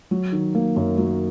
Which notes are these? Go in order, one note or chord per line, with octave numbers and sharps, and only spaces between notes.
F#3
D#3
A#3
F#2
F#3